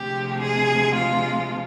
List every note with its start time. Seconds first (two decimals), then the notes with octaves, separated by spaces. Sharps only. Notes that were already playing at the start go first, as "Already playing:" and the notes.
Already playing: D2 C3 F3 G#3 G4
0.39 G#4
0.95 F4